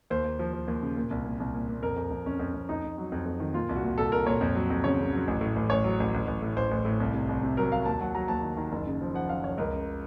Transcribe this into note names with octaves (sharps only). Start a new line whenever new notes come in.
D#2 C5
D#2
F3
F3
D#2
C#3
A#2
C2
A#2
C2
A#2
A#2
F2 A#4
F2
F2
F2 C#4
F2
F2
F2 D#4
F2
F#3
F2
F2
D#3
A#2 F4
C2
F#4
A#2
C2 A4
C2 A#4
A#2 C#5
F2
F#3
F2
C#3 C#5
C#3
F#3
A1
A2
A1
A1 C#5
F#3
A1
A1
A1
A2
A1 C5
A1
A2
C2
C3
C2
C3
F#3 A#4
F#3 F5
D#2 A5
F#3 F#5
F#3 A#5
D#2 A5
D#3
D#3
F#1
C#3
F3
F3 F#5
F#2 F5
F3 C#5
C#2 A#4
C#3